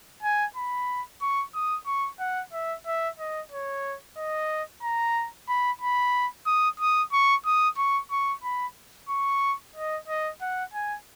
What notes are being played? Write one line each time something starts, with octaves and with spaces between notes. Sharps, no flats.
G#5
B5
C#6
D#6
C#6
F#5
E5
E5
D#5
C#5
D#5
A#5
B5
B5
D#6
D#6
C#6
D#6
C#6
C#6
B5
C#6
D#5
D#5
F#5
G#5